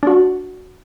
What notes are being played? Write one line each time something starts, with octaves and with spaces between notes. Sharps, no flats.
D4 F#4